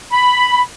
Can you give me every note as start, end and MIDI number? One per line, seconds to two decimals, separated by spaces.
0.12 0.61 83